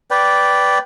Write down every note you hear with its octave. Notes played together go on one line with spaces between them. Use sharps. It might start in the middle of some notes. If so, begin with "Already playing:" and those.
B4 D5 G5